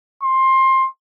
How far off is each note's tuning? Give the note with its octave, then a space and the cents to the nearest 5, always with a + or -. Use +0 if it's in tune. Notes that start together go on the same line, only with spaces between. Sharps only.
C6 +20